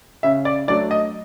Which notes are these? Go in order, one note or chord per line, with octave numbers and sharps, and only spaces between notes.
C#3 E5
D5
F#3 A3 D4 D5
D#5